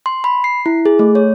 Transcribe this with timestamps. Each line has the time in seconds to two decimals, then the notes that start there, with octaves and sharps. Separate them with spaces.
0.06 C6
0.24 B5
0.44 C7
0.66 E4
0.85 G#4
0.99 A3
1.15 C#5